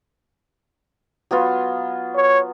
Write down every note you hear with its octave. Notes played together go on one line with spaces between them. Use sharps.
F#3 B3 F4
C#5